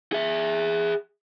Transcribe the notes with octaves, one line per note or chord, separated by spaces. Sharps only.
G#4 E5